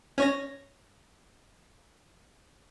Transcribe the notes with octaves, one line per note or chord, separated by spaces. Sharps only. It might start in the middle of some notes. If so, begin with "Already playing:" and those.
C#4 C#5 A#6